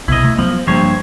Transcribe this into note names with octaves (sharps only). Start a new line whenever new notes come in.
B1 C3 B3 E4 D#5
A3
F3 F#3 B3
G2 F3 G#3 A#3 C5 C#5